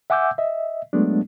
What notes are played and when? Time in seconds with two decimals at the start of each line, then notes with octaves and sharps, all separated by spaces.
0.10 E5 F#5 G#5 D6 E6 G6
0.38 D#5 E5
0.93 F#3 G#3 A3 B3 D4